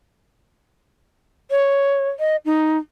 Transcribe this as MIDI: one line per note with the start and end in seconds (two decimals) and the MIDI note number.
1.51 2.09 73
2.19 2.36 75
2.45 2.77 63